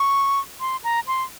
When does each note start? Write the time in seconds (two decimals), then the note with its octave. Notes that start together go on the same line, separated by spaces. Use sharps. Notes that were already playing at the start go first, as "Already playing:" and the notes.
Already playing: C#6
0.60 C6
0.84 A#5
1.07 C6